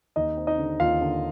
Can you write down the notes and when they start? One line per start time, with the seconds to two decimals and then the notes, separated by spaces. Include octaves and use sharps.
0.16 D#2 D#4 D#5
0.37 C4
0.47 D#4 D#5
0.58 D3
0.80 D#2 F4 F5
1.01 D3